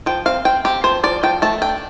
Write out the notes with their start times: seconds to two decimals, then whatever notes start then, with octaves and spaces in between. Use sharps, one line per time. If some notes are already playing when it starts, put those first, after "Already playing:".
0.06 F3 G5
0.26 C4 F5
0.45 C4 G5
0.65 C4 G4
0.84 F3 C5
1.03 F3 D5
1.23 F3 G5
1.42 A3 A5
1.62 D4 G5